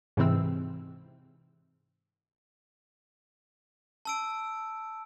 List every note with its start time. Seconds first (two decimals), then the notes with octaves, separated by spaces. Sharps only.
0.17 G#2 C3 E3 C4 E6
4.05 A5 E6 D7